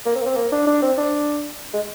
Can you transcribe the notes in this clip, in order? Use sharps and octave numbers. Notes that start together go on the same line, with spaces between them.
A#3
C4
A#3
C4
A#3
D4
D4
C4
D4
G#3